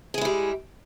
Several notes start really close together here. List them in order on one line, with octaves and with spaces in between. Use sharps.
G#4 G#3 E4 G3